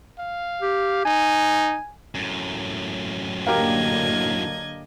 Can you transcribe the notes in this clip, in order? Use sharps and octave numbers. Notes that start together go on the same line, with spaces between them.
F5
G4
D#4 G#5
F#2 A2
D3 F#3 A#3 G4 A#4 D#5 F5 G#6